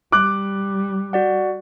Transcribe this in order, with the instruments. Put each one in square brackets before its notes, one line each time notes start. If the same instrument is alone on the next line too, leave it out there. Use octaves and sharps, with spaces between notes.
[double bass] G3 [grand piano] D6 F#6
[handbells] F#4 D5 F#5